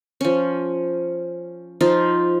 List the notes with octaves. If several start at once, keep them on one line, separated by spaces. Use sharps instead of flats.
F3 C#4
F3 D#4 F4